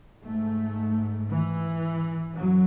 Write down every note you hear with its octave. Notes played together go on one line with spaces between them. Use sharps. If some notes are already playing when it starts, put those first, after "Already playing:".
G#2 A3
E3
F#2 F#3